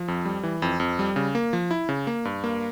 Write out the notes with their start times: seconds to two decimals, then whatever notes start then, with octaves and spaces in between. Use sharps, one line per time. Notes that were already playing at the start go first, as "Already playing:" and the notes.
Already playing: F3
0.08 F2
0.25 G3
0.43 E3
0.62 F2
0.80 F2
0.99 G3
1.16 C#3
1.35 A#3
1.53 F3
1.71 E4
1.89 C#3
2.07 A#3
2.25 G2
2.44 A#3